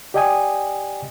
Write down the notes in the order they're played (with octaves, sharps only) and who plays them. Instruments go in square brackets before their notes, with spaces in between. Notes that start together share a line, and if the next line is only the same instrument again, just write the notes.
[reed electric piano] G4 D5 D#5 G5 G#5 D#6